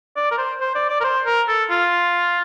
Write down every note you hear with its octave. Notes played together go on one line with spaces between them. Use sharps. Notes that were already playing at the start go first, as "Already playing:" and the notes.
D5
A#4
C5
C5
D5
D5
A#4
C5
A#4
A4
F4